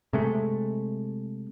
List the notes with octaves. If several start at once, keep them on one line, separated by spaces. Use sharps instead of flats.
C3 G#3 A3